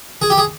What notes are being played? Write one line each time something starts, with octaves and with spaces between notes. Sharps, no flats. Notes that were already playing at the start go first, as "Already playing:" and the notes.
G#4
G4
G#4